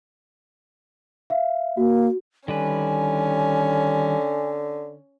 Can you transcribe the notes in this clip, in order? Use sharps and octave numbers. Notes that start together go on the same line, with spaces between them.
E5 F5
A#3 F#4
D3 D#3 G3 C#4 B4 G#5